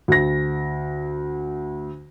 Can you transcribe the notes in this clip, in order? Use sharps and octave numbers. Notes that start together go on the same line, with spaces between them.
D2 A#6